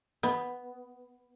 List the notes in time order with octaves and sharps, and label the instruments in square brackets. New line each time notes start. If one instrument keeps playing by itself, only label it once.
[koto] B3